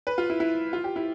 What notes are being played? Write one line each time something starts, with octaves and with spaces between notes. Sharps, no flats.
B4
F4
E4
E4
F4
G4
E4